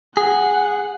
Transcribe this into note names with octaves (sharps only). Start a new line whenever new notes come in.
G#4 F#5